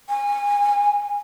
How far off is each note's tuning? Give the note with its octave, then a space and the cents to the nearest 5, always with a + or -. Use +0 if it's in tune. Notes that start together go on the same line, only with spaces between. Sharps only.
G#5 -25